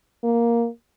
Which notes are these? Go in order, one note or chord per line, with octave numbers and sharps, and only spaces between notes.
A#3